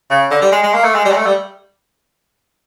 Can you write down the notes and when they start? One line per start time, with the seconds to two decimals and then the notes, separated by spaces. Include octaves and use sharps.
0.10 C#3
0.31 D3
0.42 G3
0.52 G#3
0.63 G#3
0.74 A#3
0.84 A3
0.95 G#3
1.05 G3
1.12 G#3
1.16 A3
1.26 G3